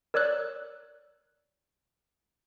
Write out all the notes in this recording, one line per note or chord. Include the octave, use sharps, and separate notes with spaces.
A#4 C#5 D5 E6 F#6